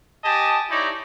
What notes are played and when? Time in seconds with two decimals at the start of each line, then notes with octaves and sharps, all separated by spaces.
0.24 G4 D#5 G#5 A5
0.70 D#4 E4 G4 C#5 D5